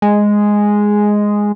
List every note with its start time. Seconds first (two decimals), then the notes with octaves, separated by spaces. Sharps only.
0.02 G#3